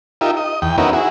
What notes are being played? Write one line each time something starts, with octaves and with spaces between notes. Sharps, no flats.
D#4 F4 G4 A#4 E5
D#5
E2 G5
B3 C#4 D#4 E4 F#4 A#4
E4 F#4 G#4